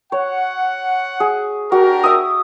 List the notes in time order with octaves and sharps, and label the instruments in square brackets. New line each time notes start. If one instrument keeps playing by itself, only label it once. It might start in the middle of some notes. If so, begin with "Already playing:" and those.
[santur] C#5 [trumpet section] F#5
[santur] G#4
[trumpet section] D4 G4 A#4 [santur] F#4
[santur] E5 D#6